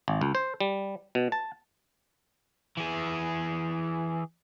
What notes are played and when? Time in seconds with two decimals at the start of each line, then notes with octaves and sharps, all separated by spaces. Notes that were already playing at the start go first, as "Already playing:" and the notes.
0.08 G#1
0.21 C#2
0.35 C5
0.61 G3
1.15 B2
1.32 A5
2.77 E3 G#4